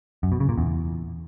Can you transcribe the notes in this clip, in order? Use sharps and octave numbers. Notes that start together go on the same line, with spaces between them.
F#2
B2
C#3
A#2
E2